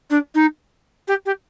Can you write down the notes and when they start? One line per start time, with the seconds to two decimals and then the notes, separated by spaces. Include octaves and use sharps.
0.10 D4
0.35 D#4
1.08 G4
1.26 G4